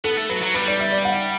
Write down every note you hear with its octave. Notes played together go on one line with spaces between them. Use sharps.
B3 A4
A3
F#3 B4
F#3
G3 B4
D5
E5
D5
F#5